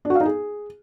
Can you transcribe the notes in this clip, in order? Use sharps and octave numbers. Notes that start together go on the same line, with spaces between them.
D4
F#4
F5
D#4
G#4